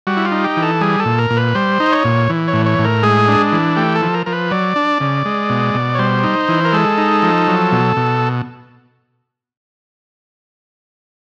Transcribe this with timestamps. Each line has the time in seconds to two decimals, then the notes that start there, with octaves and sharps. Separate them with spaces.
0.07 G3 F#4
0.17 E4
0.25 F4
0.31 D#4
0.44 G4
0.57 E3
0.62 A4
0.81 G3 G#4
1.00 A4
1.06 A#2
1.19 A#4
1.30 A#2
1.37 B4
1.55 G3 C5
1.80 D#4
1.92 C#5
2.05 A#2
2.29 E3
2.48 C#5
2.53 A2
2.66 C#5
2.79 A2
2.85 A#4
3.03 G#3 G#4
3.28 D4
3.52 E3
3.76 A3 G4
3.95 A4
4.02 F3
4.14 A#4
4.26 F3 A#4
4.33 B4
4.51 F#3 D5
4.76 D4
5.00 C#3
5.25 G#3
5.50 B2
5.74 B2
5.95 C#5
5.99 G3 C5
6.24 D#4
6.49 E3
6.65 A#4
6.73 G#3 A4
6.98 D#4
7.23 F3
7.48 F#3
7.72 B2
7.97 B2